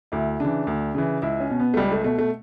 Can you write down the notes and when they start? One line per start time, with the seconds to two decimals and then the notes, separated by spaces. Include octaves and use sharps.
0.12 D2 E4
0.40 C#3 E3 D4
0.67 D2
0.95 C#3 E3
1.22 C#2 E4
1.40 C#4
1.50 B2
1.60 B3
1.74 A3
1.77 C#2 G3
1.92 A3
2.04 B2 A3
2.19 A3